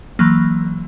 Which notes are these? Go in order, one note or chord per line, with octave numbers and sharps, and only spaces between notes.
E3 F#3 A#3